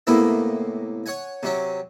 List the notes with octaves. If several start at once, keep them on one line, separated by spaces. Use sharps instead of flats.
A2 C3 A#3 B3 E4
C#5 F#5 G#5
C3 F#3 C#4